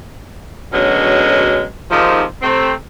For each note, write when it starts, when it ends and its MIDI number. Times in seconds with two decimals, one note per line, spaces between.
0.73 1.64 38
0.73 1.64 47
0.73 1.64 54
0.73 1.64 56
0.73 1.64 61
1.90 2.23 44
1.90 2.23 48
1.90 2.23 51
1.90 2.23 53
2.42 2.72 48
2.42 2.72 57
2.42 2.72 60